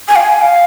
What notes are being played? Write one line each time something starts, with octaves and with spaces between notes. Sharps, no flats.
G#5
F5
G#5
F5